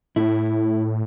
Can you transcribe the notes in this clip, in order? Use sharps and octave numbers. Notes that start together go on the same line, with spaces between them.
A2 E4